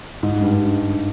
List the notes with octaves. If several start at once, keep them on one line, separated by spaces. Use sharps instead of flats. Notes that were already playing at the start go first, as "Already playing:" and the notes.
G#2
G2